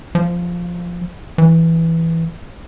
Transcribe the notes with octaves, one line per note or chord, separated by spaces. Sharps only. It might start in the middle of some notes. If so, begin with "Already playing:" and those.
F3
E3